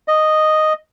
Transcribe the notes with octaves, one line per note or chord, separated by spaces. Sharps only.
D#5